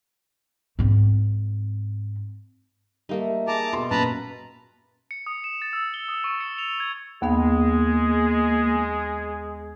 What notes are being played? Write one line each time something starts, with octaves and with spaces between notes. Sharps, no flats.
G#2 C4
G3 A3 A#3 D#4
G#4 E5 A5 A#5 D6
B2 C6
F#2 A#2 B4 A5 A#5
C#7
D#6
E7
A6
E6
G7
D#6
C#6
C#7
F7
G#6
D#2 G#3 A#3 B3 G#4 F5